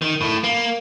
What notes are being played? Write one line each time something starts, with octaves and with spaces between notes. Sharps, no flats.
D#3
A2
A#3